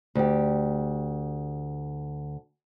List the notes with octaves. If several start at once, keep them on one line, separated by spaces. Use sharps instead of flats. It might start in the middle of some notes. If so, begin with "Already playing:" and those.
D2 G4